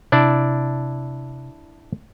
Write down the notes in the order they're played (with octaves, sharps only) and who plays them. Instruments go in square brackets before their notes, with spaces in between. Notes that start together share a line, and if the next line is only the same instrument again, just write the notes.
[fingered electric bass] C3 [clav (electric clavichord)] D4 E4 D5